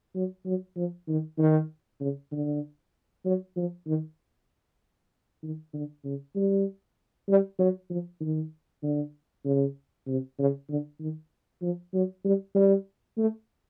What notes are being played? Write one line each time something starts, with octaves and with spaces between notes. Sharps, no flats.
F#3
F#3
F3
D#3
D#3
C#3
D3
F#3
F3
D#3
D#3
D3
C#3
G3
G3
F#3
F3
D#3
D3
C#3
C3
C#3
D3
D#3
F3
F#3
G3
G3
A3